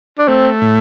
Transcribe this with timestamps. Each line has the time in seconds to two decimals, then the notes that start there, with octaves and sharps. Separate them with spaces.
0.19 D4
0.28 A3 C4
0.62 A2